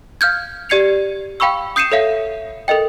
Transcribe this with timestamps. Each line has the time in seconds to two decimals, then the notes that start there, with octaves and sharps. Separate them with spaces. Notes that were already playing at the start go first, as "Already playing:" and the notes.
0.21 F5 F6 G6 G#6
0.69 G4 D5 G#6 C7 C#7 F7
1.40 F5 G5 B5 C#6 E6
1.76 D#6 G6 C7 C#7 D#7 E7
1.92 A4 C#5 E5 F5
2.68 A4 A#4 D#5 G5